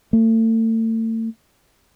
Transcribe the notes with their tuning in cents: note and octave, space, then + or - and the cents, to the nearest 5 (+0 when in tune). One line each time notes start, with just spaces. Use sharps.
A3 +40